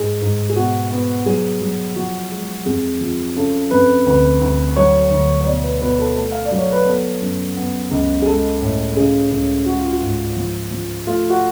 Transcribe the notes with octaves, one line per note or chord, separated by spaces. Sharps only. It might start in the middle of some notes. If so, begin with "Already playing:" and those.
Already playing: G#2 G#4
G#2
G#4
B2 F#4
B3
F#3 G#4
F#3
F3 F#4
G#3
F2 G#4
F3
C#3 A4
F2 B4
D2 B4
D2
F#3 C#5
D2
C#5
B2 D5
B4
B2 B4
A4
A3 A4
F5
D5
F#3
C#5
B4
B3 A4
F#2
B3
C#2
G#4
G#3 A4
A2
C#3 G#4
C#2
G#3 F#4
F4
F#4
G#2
F3
F3
A3 F4
F#4